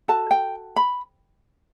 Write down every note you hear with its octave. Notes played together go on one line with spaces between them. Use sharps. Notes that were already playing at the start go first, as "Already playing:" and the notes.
F#4 A4 A5
G5
B5